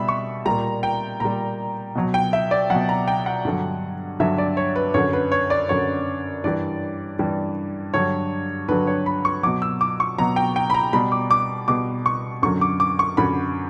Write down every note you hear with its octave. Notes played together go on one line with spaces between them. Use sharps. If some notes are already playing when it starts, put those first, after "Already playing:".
Already playing: B2 G3 E5 B5
C#6
A#2 G3 A#5
G5
A#2 G3 A#5
B2 F#3
G5
E5
D5
B2 F#3 F#5
A#5
G5
F#5
G2 D3 F#3
G2 D3 F#3 E5
D5
C#5
B4
F#2 D3 F#3 C#5
B4
C#5
D5
F#2 D3 F#3 C#5
G2 E3 G3 D5
G2 E3 G3
G2 D3 F#3 C#5
G2 D3 F#3 B4
C#5
B5
C#6
B2 F#3 D6
E6
D6
C#6
B2 F#3 A#5
G5
G5
B5
A#5
B2 G3 B5
D6
D6
B2 G3 D6
C#6
F#2 D3 F#3 C#6
D6
D6
C#6
F#2 D3 F#3 B5